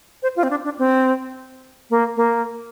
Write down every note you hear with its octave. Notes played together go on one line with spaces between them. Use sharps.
C5
F4
C4
D4
D4
C4
A#3
A#3